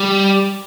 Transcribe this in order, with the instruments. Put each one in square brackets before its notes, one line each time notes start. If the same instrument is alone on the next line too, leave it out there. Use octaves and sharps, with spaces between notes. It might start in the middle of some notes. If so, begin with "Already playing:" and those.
Already playing: [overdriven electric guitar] G3